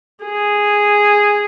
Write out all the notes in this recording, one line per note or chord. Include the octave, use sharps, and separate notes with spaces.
G#4